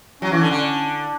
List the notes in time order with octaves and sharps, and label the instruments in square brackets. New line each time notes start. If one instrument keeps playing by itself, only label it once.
[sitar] F#3 [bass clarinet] C#4
[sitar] E3
D3
D3